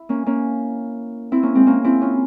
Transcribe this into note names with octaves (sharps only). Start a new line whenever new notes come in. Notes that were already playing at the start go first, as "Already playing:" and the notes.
Already playing: E4
A#3 C#4
A#3 C#4
C4 E4
A#3 C#4
G#3 C4
A#3 C#4
C4 E4
C#4 F4